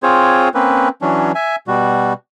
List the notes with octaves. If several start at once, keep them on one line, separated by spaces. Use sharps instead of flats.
C4 F4 G#4 C5 C#5
A#3 C4 C#4 B4
E3 F#3 C#4 D4
E5 G#5
B2 G3 F#4